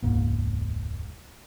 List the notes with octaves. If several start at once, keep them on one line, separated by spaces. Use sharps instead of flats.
E1 C#2 G#2 A#3